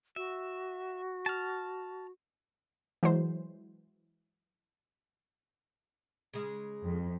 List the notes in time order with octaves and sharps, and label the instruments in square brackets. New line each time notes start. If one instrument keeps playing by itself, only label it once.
[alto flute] F#4 [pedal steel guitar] E5
[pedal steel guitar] A5 F6
[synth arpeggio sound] E3 F#3 G#3 C5
[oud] C#3 G#3
[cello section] F2